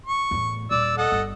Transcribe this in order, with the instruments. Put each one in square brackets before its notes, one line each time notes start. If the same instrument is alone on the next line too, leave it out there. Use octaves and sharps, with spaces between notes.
[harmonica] C#6
[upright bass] E2 A2
[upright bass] D#1 [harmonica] D5 E6
[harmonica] A4 D#5 F#5
[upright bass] G1